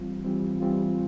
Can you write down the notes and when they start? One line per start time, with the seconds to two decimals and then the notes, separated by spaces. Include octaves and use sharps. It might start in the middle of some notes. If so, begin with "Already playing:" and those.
Already playing: E3 G3 C4 F4
0.25 E3 G3 C4 F4
0.60 E3 G3 C4 F4